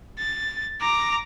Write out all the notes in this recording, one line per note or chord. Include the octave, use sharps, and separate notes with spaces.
A6
A#5 D6